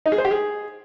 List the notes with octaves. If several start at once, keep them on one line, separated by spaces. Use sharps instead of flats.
D#4
G#4
C5
G4
G#4